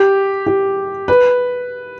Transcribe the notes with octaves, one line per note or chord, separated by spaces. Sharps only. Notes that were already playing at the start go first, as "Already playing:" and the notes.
Already playing: G4
G4
B4